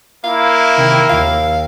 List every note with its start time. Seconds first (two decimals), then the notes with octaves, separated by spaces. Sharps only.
0.24 A#3 E4 F5
0.76 C3 D#3
1.10 D#2 F5